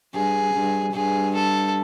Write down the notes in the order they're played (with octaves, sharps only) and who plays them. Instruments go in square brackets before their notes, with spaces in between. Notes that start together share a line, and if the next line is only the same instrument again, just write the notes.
[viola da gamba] G2 [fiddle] G#4
[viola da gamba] G2
[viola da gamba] G2 [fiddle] G#4
[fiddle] A4